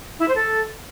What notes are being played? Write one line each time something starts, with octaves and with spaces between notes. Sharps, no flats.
E4
C5
A4